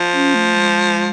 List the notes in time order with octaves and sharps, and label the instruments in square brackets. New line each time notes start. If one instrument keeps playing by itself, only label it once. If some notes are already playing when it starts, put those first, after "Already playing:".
Already playing: [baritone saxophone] F3
[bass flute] C#4
A3
G#3